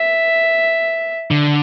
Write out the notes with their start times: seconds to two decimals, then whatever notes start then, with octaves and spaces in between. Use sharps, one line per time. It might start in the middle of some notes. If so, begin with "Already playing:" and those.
Already playing: E5
1.31 D3